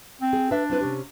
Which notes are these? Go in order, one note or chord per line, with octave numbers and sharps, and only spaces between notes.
C4
G#4
D4 B4 E5
C4 E4 B4
C3 C#4 G4